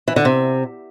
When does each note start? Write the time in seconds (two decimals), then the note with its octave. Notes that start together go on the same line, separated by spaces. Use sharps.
0.08 E3
0.16 D3
0.25 C3